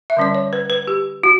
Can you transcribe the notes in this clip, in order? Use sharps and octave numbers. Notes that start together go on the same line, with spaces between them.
E5
D3 G3 C#4 D5
C#5
B4
B4
G4
F#4